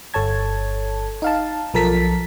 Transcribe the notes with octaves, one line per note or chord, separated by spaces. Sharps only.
G1 A4 C#5 A5 G#6
D#4 F5 A5
B1 F3 A4 A#4 A5 B6